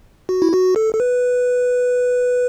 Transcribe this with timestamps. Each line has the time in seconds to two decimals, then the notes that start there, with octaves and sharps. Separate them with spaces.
0.29 F#4
0.42 E4
0.53 F#4
0.76 A4
0.95 A4
1.00 B4